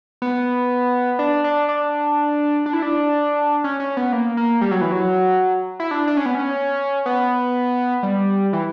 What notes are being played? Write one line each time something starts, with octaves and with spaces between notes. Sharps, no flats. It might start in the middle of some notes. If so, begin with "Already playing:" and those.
B3
D4
D4
D4
D4
E4
D4
C#4
C#4
B3
A#3
A#3
G3
F#3
E3
F#3
E4
D4
D4
C#4
B3
C#4
B3
G3
E3